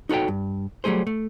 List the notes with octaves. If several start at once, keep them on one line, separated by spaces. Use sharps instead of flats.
D#4 F#4 A4 C#5 G5
G2
F#3 G3 A3 G#4 C5
A3